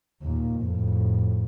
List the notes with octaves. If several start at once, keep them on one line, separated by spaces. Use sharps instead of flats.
D#2 A#2
F2 A2